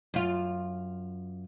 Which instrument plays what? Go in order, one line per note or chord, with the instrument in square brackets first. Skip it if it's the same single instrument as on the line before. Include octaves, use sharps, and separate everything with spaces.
[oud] F#2 F4